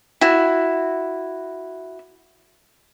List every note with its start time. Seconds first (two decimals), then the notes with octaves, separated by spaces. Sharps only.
0.21 E4 F#4